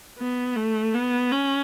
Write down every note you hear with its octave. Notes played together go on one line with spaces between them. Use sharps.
B3
A3
B3
C#4